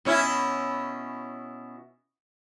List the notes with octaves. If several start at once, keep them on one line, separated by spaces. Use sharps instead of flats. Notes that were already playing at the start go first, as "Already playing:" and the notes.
B2 C#4 E4